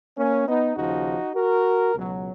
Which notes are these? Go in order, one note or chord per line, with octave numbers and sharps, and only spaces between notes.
A#3 C#4
B3 D#4
D#2 C#3 F3 D#4 F#4
F#4 A#4
C#2 B2 F#3